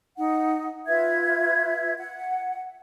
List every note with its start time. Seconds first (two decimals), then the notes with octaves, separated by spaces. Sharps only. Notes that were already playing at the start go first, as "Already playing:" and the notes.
0.17 D#4 F#5
0.87 F4 B4 E5 G#6
1.98 F#5